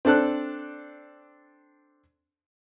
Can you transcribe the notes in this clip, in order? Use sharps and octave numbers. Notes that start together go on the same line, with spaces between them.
C4 D4 A4 F#6